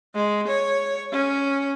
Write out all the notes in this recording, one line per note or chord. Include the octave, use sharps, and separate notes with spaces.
G#3
C#5
C#4